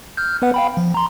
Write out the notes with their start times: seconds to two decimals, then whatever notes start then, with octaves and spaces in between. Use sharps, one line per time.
0.17 F6 G6
0.42 B3 B4 F#5
0.54 F5 G5 B5
0.77 F3
0.94 A#5 C6